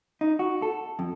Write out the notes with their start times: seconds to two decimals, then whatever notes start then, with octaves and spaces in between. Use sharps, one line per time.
0.21 D#4
0.39 F#4
0.62 A4
0.99 F2